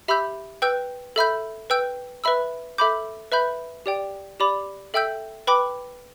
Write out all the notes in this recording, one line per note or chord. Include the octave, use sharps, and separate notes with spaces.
G4 E5 B5 E6 G6
B4 G5 E6 G6
A4 E5 B5 G6
B4 G5 E6 G6
B4 E5 B5 E6
A4 E5 B5 D6 G6
B4 E5 B5 G6
G4 D5 G5
G4 D5 B5 D6
A4 E5 G5 E6 G6
B4 G5 B5 D6